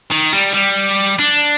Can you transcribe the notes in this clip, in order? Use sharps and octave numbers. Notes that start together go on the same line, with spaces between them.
D#3
G3
G3
D4